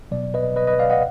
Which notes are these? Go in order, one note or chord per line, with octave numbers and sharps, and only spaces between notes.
B2 F#3 B3 D5
B4 D#5
B4 D#5
B4 D#5
D5 F5
D#5 F#5